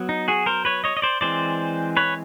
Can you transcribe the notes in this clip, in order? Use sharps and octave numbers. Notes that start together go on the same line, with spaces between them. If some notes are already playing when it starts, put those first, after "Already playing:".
Already playing: F#3 B3
D#4
F#4 G#4
A#4 C5
B4 C#5
C#5 D#5
D#5
C5 D5
E3 G#3 C4 C5 D5
B4 C#5